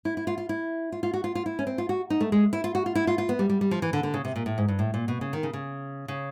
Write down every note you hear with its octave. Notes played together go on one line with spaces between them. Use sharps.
E4
E4
F4
F4
E4
F4
F4
F#4
F4
F4
E4
C#4
C4
F4
F#4
D#4
A3
G#3
E4
F4
F#4
F4
E4
F4
F4
B3
G3
G3
G3
F3
E3
D3
D3
C#3
C3
A#2
A2
G#2
G2
A2
A#2
B2
C#3
D#3
C#3
C#3
C#3